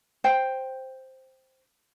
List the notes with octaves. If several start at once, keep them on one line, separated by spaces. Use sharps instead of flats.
C5 G5